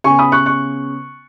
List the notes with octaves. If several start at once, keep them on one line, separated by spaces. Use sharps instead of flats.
C#3 B3 G#5 C#6
B5 D#6
C#6 F#6
C#6 F#6